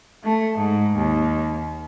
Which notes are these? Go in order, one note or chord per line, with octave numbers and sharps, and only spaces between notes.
A3
G#2
D#2